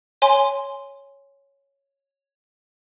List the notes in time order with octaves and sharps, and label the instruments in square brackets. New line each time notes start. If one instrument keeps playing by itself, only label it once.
[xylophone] C#5 G#5 C6